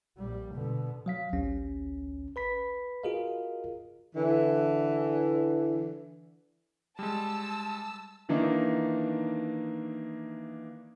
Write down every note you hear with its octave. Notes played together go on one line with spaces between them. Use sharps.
A#1 G3
B2 D3
F#3 F5 B6
A1 D2 C#4
B4 B5 B6
F4 F#4 G#4 A#4 D#5 F5
D3 E3
G3 G#3 A5 E6
D#3 E3 A#3 D4 D#4